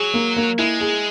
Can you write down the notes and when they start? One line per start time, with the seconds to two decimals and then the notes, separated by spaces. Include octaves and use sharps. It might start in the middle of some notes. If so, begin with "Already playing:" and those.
Already playing: F#3 G#4
0.14 A#3
0.37 A#3
0.58 G#3 E4
0.81 G#4